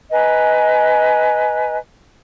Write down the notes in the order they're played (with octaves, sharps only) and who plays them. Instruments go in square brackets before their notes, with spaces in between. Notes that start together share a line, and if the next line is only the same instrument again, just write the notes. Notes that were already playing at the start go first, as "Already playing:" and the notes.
[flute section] B4 D#5 G#5 A#5